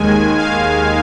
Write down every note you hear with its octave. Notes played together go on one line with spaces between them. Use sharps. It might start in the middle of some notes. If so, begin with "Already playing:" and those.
Already playing: D#2 D#3 G#3 G#5
F5